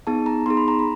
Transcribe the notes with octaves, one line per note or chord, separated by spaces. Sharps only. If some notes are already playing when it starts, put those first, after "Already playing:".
B3 D#4 G#4 A5
A#5
B3 D#4 G#4 C6
B5
A#5
B5